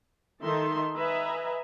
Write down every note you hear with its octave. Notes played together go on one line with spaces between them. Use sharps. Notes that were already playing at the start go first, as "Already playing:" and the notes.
D#3 D#4 A4 E5 C6
B4 D#5 E5 G#5 A#5